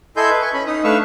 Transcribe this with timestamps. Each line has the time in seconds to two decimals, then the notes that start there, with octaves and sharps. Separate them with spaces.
0.17 E4 A4 D#5 G#5 C6 G6
0.30 B4
0.42 G#5 C#6
0.53 C#4 B5
0.67 D#4 D#6
0.84 A3 D4 B4 F5 C#6 E6